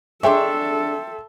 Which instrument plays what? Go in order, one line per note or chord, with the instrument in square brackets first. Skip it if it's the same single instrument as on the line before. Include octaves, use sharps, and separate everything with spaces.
[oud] D4 G#4 C#5 [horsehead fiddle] A4 [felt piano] E5 G5 C6